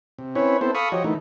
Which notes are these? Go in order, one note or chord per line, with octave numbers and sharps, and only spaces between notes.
C3
C4 C#4 E4 B4 C#5
B3 C4 E4 A4 C5
A4 F5 B5 C#6 D#6
F3 F#4 G4 C#5 D#5
D#3 E3 A3 D#4